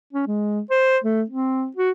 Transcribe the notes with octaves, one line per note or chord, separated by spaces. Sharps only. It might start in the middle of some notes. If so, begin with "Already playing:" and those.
C#4
G#3
C5
A3
C4
F#4